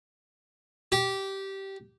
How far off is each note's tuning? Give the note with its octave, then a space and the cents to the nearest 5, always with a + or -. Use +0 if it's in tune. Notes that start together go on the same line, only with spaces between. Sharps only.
G4 -15